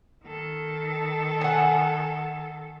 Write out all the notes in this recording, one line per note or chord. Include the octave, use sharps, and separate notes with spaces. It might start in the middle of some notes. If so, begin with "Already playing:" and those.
D#3 A4
F#5 G#5